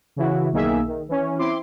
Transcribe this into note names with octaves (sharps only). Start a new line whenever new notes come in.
C#3 E3 E4 F#4
B1 D#3 A#3 G#4 E5
D#3
E3 C#4
C4 E4 C6 D6